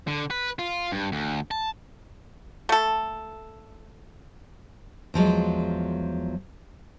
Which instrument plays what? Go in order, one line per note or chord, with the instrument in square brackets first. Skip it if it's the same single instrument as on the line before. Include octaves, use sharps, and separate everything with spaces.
[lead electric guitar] D3
B4
F4
G2
D2
A5
[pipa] A3 A4
[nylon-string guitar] E2 F3 F#3 G#3